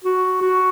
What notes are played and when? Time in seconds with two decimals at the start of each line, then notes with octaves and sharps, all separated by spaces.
0.05 F#4
0.42 F#4